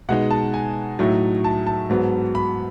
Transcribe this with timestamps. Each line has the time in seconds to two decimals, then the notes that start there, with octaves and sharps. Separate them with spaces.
0.09 B2 G#3 D#4 F#5
0.30 A5
0.54 G#5
0.99 A2 F#3 A3 D#4
1.44 A5
1.67 A5
1.90 G#2 F#3 B3
2.35 B5